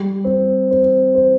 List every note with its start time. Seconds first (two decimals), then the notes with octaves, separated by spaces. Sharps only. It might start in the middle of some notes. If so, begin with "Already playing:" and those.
Already playing: G3
0.24 C4
0.71 C4
1.15 C5